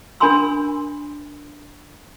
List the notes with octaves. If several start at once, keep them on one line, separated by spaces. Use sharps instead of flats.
D4 A#4 G#5 B5 C6 E6